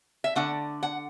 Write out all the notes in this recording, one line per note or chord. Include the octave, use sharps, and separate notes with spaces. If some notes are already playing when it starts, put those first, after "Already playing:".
E5
D3 A3 D4 F#5
F#5